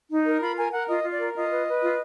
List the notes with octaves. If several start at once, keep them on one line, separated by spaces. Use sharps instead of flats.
D#4
A#4
F4 B5
A#4 G#5
A#4 F#5
F4 D#5
F4
D5
A#4
F4 D#5
B4
B4
F4